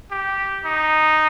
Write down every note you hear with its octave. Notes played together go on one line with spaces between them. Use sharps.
G4
D#4